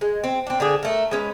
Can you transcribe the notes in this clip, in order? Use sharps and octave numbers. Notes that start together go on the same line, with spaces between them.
G#3
C4
C4 D4
D3 D4 G#4
A3 A#4
G#3 C#4 B4